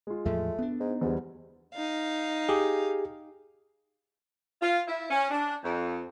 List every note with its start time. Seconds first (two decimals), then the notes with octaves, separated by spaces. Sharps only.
0.07 G#3 F4
0.25 E2 A2 F3 A3
0.59 B3 D4
0.80 G#2 D#4
1.01 E2 G#2 G3
1.74 D#4 F5
2.49 G4 G#4
4.62 F4
4.87 E4
5.10 C#4
5.31 D4
5.64 F2